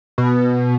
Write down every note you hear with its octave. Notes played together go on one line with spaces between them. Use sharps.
B2